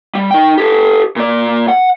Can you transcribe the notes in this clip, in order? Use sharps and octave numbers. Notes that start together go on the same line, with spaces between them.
G3
D#4 G5
G4 A4
A#2 D5
F#5